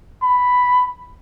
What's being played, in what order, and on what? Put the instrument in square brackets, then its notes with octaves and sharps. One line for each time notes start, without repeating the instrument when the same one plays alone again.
[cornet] B5